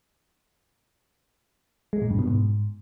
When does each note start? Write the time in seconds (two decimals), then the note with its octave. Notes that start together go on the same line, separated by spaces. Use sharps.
1.93 G#3
2.02 A#2
2.10 G2
2.19 B2
2.28 G#2